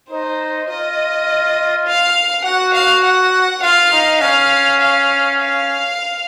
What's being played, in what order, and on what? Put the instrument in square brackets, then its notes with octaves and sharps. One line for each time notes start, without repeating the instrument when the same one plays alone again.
[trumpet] D#4 [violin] C5
[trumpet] F4 [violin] D#5
[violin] F5
[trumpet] F#4 [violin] F#5
[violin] F5
F#5
[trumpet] F4 [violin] F5
[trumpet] D#4
[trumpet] C#4 [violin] F5
[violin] F5
F5